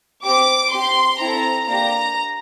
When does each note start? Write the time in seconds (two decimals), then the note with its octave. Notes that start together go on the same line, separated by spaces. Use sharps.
0.25 C4 G4 D6
0.73 C4 G4 C6
1.20 C4 E4 A4 A#5
1.68 A#3 D4 G4 A#5